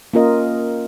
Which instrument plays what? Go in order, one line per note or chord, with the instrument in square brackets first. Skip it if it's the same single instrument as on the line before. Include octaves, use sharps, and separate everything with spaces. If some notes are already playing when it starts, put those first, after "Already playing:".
[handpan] A#3 C#4 F4 A#4 D#5